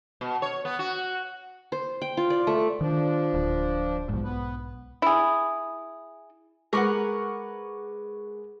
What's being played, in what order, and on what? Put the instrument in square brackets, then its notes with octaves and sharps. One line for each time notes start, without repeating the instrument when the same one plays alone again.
[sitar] B2
C#5
B3
F#4
[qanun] C5
G5
F4
D5
A3
[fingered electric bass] D#3 [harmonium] F3 D4
[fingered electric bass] D1
[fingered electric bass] B1 G#2 [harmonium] F3
[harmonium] B3 B4
[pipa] E4 G#4
[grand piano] G#3 C#6 D6 [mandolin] A#4 B4 F#5